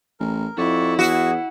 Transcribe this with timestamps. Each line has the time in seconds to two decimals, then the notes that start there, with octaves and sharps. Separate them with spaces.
0.20 A1 A#4
0.57 F2 E4 F#4 D5 C#6
0.99 E2 F#4 G#4